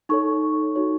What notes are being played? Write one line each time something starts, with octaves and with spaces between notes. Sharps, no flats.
D#4 A4 C#5 C#6
D#4 F#4 C#5